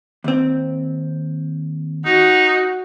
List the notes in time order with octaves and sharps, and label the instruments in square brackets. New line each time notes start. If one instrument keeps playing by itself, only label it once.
[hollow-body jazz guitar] D#2 C4
[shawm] D#4 [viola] F#4